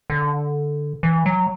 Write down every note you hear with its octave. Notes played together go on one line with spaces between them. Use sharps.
D3
E3
F#3